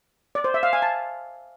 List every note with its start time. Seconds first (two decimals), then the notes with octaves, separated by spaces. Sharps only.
0.35 D5
0.44 C5
0.54 E5
0.63 F5
0.73 G#5
0.82 A5